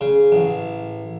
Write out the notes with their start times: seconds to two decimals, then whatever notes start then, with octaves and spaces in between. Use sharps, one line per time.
0.01 C#3
0.32 A1